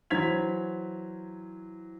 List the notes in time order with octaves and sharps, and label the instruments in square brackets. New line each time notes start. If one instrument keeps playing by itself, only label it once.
[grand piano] E3 F#3 C5 G#6 B6 F7